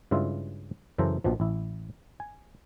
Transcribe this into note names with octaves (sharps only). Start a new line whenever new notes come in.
G2 C#3 G#3 E4 F4 E5
F#2 C#3 E3 A4 C5 A#5
A#1 B2 F3
A1 E4
G#5